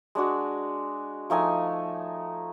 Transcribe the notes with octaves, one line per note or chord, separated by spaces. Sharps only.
G#3 D4 F#4
F3 A3 D#4 G#5